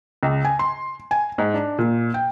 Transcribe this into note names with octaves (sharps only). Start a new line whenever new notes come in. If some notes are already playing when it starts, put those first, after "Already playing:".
C#2
G#5
C6
G#5
G#2
D4
A#2
G5